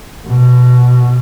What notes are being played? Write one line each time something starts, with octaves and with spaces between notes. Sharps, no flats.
B2